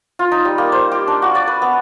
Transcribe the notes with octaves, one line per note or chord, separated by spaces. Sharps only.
F4
D#4
G3
A#3
C5
G4
D4
F#4
D5
B4
B3